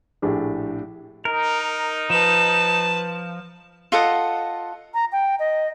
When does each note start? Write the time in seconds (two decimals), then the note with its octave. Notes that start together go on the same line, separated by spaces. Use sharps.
0.22 A#1 A2 D4 G4 G#4
1.25 D#4 A#4
2.10 F3 B4 A5 E7
3.92 F4 A4 D#5 F#5
4.94 A#5
5.12 G5
5.39 D#5